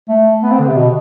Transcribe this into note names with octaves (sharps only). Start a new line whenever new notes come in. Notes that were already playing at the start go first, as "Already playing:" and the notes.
A3
B3
C4
D3
C3
B2